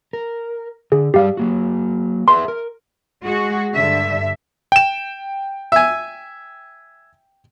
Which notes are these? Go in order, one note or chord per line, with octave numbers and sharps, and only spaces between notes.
A#4
D3 G#4
G2 G3 G4 D5 F5
F#3 A#3 F#4
G#4 B4 E5 C6
A#4
G#3 F#4 G#4
G2 D3 E5
G5 E7
E5 G#5